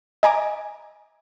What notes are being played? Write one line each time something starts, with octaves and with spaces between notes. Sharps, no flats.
D#5 G#5 A#5 D6